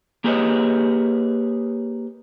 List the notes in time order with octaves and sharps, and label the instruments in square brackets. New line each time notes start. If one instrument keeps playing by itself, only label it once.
[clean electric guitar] A#3 G4 G#4 B4 C#5 D#5